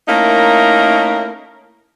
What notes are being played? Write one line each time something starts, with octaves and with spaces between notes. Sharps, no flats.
A3 A#3 C#4 D#4 E4 A#4